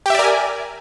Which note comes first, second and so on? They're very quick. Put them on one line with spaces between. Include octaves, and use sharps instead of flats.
G4 E5 D5 A#4 G#5